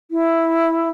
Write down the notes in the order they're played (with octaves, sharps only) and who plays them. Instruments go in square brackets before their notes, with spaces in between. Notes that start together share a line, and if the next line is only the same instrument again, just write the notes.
[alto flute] E4